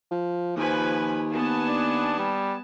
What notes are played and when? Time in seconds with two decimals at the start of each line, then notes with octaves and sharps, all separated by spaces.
0.11 F3
0.56 D#2 F3 B4 G#5
1.32 B3 G#5 A5
1.68 D4
2.18 G3